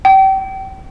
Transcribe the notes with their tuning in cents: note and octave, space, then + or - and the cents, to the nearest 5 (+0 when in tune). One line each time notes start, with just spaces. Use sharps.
G5 -30